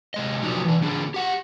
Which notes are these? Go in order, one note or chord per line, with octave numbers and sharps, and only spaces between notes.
C3 G#3 D#5
C3 F3 F#3 D4 D#4 G4
E3 D4
D3 A#3 D4 G#4
G4 F#5